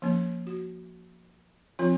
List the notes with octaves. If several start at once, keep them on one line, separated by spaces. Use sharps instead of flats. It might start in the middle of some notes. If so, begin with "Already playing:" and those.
F3 A#3 C#4
F#4
F3 C4 F4